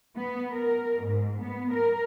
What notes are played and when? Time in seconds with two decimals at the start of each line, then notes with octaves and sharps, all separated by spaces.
0.16 B3
0.52 A#4
1.03 G#2
1.42 B3
1.74 A#4